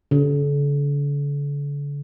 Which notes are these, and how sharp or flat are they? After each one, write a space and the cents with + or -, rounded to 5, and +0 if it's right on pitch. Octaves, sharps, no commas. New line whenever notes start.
D3 -40